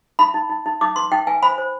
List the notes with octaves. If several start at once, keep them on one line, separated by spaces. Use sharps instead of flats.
D#4 B5
D#4
D#4
D#4
D#4 D6
B4 C6
D#4 G5
B4 G#5
C5 B5
C5